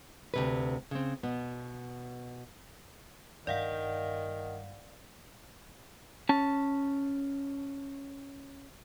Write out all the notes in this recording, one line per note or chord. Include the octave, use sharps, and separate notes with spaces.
D2 C3 B4
C#3 C4
B2 B3
G2 D#3 D5 F5 F#5
C#4 A5